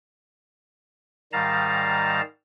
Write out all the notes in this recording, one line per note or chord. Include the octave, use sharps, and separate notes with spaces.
G#2 D#3 G3 F5 A5 A#5